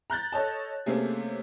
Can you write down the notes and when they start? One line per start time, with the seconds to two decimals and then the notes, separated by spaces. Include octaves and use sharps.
0.10 A#5 F#6 G6 A6
0.32 A4 C#5 D#5 A5
0.86 C3 A3 A#3 C#4 G#4